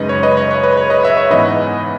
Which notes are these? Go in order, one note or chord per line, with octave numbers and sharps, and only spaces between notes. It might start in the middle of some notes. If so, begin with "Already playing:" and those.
Already playing: F#2 C#3 G#3 D#4 B4 D#5
C#5
B4 D#5
C#5
C#5
B4
C#5
B4 D#5
C#5 E5
C#5 E5
G#2 E3 B3 D#4 B4 D#5